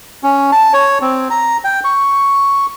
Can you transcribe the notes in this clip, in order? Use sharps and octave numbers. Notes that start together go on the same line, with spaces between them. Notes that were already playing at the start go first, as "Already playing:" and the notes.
C#4
A5
C#5
C4
A#5
G5
C#6